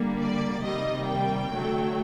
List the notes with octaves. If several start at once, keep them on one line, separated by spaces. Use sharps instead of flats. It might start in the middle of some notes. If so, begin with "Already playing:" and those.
Already playing: D3 G3 A#3
D5
C3 D#3 G3 A#3 D#5
G5
D3 F#3 A3